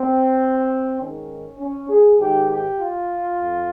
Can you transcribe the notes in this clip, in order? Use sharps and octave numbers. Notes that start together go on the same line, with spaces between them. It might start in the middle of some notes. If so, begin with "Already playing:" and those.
Already playing: C4
G#2 D#3 C#4
C#4
G#4
G#2 D#3 G4
G4
F4
F2